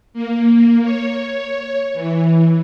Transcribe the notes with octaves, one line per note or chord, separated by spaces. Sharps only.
A#3
C#5
E3